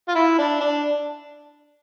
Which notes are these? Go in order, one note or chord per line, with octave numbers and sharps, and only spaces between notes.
F4
E4
D4
D4